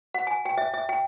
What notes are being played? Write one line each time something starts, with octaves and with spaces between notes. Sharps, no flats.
F#5
G#5
G5
E5
E5
G5